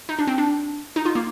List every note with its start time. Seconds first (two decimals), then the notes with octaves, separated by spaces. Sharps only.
0.09 D#4
0.19 D4
0.27 C4
0.38 D4
0.96 D#4
1.05 F4
1.15 A#3